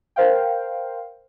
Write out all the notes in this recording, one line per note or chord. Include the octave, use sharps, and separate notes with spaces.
A#4 C5 F5 G5